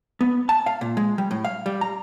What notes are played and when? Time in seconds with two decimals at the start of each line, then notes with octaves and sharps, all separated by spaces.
0.21 B3
0.49 A5
0.66 F5
0.81 A#2
0.97 G#3
1.18 G3
1.31 A2
1.45 F5
1.66 G3
1.81 A#5